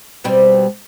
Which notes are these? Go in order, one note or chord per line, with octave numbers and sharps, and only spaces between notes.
B2 G3 C4